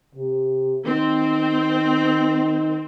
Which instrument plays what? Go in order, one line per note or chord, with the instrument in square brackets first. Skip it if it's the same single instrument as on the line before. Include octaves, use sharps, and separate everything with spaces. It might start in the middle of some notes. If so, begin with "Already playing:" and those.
[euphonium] C3
[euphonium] D#3 [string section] C4